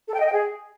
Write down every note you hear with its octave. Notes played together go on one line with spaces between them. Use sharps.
A4
G5
D#5
G5
G#4